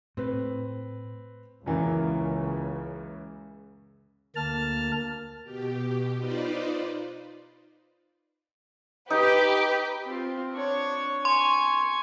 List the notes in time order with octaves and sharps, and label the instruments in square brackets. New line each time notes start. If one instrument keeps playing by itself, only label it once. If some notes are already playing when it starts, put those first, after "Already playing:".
[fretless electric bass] A2 [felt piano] C4 B4
[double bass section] C#2 C#3 [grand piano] F#2 E3 A#3
[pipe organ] D2 A#3 A5 F6
[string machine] B2 G4
D#4 F4 B4 C5 D5
[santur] D#4 [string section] G4 B4
[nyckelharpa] C4 F4
D4 C#5
[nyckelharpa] G#5 C#6 [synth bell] C6